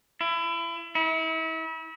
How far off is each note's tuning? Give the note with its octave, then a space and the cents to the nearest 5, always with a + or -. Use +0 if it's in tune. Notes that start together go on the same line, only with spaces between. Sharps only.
E4 +30
E4 -35